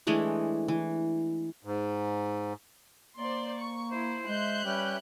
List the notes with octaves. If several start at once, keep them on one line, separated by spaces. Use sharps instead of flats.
E3 G#3 A3 D4
E3
G#2
A#3 C5 D5 C6
C#6
E4 C5
G#3 E5 F#6 G6
G3 C#4 G4 B4